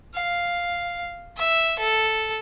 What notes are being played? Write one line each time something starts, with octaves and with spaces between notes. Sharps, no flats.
F5
E5
A4